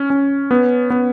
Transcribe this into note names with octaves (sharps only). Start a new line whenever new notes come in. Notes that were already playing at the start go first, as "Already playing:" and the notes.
Already playing: C#4
C#4
B3
B3